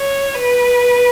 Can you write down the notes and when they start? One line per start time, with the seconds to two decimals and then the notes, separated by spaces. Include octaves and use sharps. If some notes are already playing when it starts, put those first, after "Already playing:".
Already playing: C#5
0.34 B4